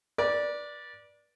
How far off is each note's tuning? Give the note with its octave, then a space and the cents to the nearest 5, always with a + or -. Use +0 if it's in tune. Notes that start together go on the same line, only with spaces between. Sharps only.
B4 -35 D5 +0